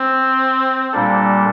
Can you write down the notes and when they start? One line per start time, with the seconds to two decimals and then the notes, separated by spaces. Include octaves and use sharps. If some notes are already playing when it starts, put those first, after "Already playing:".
Already playing: C4
0.92 A#2 G3 A#3 D4 A4